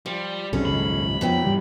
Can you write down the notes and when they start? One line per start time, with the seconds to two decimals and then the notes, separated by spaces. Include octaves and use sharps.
0.06 F3 G3
0.53 C2 C3 F#3 C#4 G#4 A4
0.65 G#1 C#2 F#2 B5
1.21 F2 B2 F3 F#3 B3 G5
1.44 G#2 E3 G3